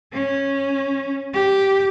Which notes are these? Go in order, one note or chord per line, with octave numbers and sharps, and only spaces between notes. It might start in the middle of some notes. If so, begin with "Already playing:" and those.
C#4
G4